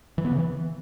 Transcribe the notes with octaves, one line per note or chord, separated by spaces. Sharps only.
E3
B3
C#3
E3